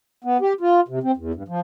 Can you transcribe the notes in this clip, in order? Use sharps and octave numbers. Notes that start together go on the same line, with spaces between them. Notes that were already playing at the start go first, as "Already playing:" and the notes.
B3
G4
F4
C3
C4
E2
G2
F3